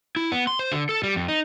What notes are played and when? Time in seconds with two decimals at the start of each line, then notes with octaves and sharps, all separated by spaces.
0.16 E4
0.32 B3
0.47 C6
0.59 C5
0.72 D3
0.89 A4
1.03 G3
1.16 F2
1.28 D#4